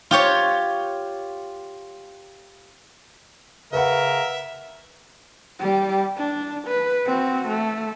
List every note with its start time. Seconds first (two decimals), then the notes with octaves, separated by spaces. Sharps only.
0.11 F4 G4 C#5
3.73 C#3 A#4 B4 E5 F#5
5.59 G3 G4
6.17 D4
6.68 B4
7.06 C4 F#4
7.48 A3